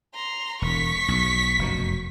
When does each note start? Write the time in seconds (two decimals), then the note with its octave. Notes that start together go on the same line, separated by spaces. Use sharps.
0.14 A#5 C6
0.62 E1 C#6 B6
1.08 B1
1.59 F1 F#2 B2